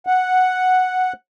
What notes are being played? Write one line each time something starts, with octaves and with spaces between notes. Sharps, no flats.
F#5